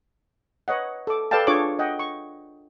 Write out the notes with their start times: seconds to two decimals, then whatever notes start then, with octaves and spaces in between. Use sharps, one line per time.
0.68 B4 C#5 D#5 F#5
1.07 A4 D6
1.31 A4 B4 D5 F5 G5 A5
1.47 D4 F4 G#4 C#5 D6
1.79 D#5 F#5 G5
1.99 C#6